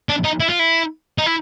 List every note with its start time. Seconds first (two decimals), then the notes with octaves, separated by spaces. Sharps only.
0.09 D4
0.24 D#4
0.40 E4
0.49 F4
0.59 E4
1.18 D#4
1.26 E4